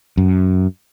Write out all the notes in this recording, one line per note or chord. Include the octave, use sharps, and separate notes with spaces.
F#2